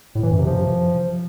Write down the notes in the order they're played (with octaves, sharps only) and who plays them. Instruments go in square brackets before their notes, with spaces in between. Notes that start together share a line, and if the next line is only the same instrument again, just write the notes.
[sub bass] A2
E3
F#2
C3
F3